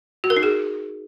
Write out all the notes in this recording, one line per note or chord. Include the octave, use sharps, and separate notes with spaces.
F#4
A#4
D#4
G#4